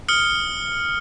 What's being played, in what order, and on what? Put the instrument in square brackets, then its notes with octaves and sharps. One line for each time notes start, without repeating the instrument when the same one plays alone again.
[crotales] D#6 F6 C#7 G7